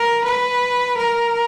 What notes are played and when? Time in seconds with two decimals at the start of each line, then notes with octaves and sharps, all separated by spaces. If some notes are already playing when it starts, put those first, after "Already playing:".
Already playing: A#4
0.24 B4
0.97 A#4